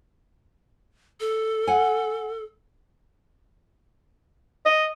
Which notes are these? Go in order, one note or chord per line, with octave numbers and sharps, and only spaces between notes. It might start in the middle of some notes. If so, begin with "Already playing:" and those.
A4
F#5 G#5
D#5